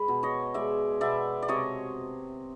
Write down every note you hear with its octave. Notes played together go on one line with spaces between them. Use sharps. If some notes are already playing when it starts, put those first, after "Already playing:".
Already playing: G#3 B4
B2
C#5 D#5
G#3 D5 E5
B2 D5 E5
D5
C3 C#5 D#5